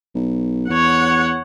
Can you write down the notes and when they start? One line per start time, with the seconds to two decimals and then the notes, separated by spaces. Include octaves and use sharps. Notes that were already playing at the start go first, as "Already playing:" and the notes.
0.15 B1
0.69 E2 C#5 F#5